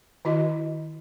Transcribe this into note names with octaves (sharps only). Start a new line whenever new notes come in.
D#3 E4 F#4 D#5